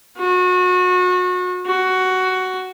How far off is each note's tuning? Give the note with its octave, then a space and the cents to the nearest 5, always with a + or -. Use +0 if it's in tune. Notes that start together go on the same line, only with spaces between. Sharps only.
F#4 -30
F#4 +10